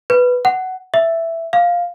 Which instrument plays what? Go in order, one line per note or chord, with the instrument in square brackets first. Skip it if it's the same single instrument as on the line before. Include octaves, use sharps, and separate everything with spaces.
[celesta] B4
F#5
E5
F5